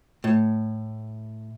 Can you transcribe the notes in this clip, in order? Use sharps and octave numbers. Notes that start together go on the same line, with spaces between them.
A2